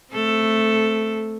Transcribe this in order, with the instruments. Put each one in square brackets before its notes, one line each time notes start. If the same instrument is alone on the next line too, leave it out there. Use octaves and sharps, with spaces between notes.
[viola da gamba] A3 C4 A4